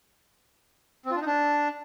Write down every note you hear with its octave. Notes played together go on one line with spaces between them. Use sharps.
C4
F4
D4
D#4
D4